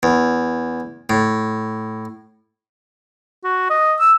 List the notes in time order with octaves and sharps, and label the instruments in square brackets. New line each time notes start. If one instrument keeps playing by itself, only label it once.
[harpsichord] E2
A2
[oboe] F#4
D#5
E6